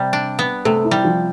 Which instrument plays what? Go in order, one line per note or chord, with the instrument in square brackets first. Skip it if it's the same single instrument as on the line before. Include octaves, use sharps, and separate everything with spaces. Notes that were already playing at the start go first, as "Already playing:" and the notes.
Already playing: [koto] C3 G3
D4
B3
[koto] C3 [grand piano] A3 A4
[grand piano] E4
[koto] G3
[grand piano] F3 F4